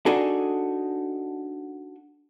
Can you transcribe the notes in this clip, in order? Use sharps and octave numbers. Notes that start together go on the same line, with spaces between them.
D4 D#4 F#4 G#4 A4